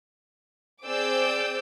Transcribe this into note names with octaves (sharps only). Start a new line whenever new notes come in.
C4 G#4 D5 D6 E6 G6